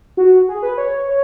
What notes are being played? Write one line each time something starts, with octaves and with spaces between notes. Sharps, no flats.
F#4
G#4
B4
C#5
C#5